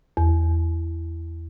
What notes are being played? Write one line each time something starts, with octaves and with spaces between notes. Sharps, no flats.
E2